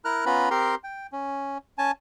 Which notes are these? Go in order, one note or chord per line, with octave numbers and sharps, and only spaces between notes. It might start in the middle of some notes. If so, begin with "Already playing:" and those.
E4 A#4 A#5 F6 F#6
B3 C#4 F4 B4 A#5 B5
C4 G4 A#4 A#5 C6
G5
C#4
C#4 G#5 A5